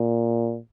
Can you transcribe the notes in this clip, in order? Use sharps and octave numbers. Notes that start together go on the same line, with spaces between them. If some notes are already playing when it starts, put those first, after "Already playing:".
Already playing: A#2